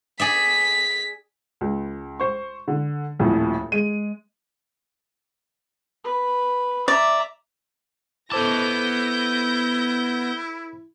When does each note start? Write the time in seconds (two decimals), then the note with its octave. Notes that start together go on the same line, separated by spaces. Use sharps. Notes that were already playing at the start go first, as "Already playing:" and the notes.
0.20 G#4 D5 E5 B6
1.61 C#2
2.20 C5 C#6
2.68 D3
3.19 D#1 F2 A2
3.72 G#3 D#7
6.04 B4
6.88 D5 E5 A#5
8.32 B3 E4 A4 C5 A5 D6 G6 A#6